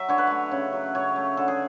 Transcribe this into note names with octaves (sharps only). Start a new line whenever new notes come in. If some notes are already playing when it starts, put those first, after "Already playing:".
Already playing: F#3 E5
D3 C#5
B4
A3 C#5
C#3
F#3
C#3 C#5
A3
D3 A4
G#4